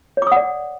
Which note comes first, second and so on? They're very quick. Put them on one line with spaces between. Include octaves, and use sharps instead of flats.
C#5 D6 D#6 F#5 D5